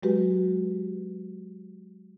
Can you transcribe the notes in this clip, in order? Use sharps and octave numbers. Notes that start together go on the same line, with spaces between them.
F#3 G#3 F#4 G4 B4